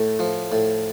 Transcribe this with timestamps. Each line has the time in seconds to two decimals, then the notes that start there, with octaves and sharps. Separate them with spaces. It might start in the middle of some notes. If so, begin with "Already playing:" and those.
Already playing: A2 A3
0.19 F3
0.52 A2